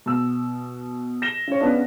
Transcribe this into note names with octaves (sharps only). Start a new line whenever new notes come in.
B2 E6
A#6 E7 G7
C#3 C#5
C#3 B3 D4